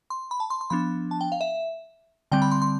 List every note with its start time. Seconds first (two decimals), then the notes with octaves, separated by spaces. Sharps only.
0.10 C6
0.31 B5
0.40 A5
0.50 C6
0.61 C6
0.70 F3 B3 D4 B5
1.11 A5
1.21 G5
1.32 F5
1.41 E5
2.32 D3 G3 C4 G5
2.42 B5
2.51 C6
2.62 C6